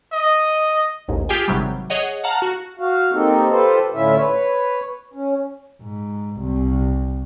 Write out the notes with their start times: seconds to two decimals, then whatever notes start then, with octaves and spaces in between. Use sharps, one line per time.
0.12 D#5
1.08 A1 D#2 G#2
1.29 F4 G4 G#4 G5 G#5
1.48 G#1 C3 F#3 G3
1.90 G#4 C#5 D#5 F#5
2.24 F5 F#5 A5 A#5 F6
2.42 F#4
2.79 F#4 F5
3.13 A#3 C4 D#4 G4 A4
3.51 F4 G4 A4 B4 C5
3.94 A2 D3 C#4 E4 F4 E5
4.17 B4 C#5
5.14 C#4
5.81 G#2
6.40 C2